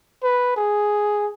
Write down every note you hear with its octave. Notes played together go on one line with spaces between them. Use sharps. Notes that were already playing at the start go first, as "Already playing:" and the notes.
B4
G#4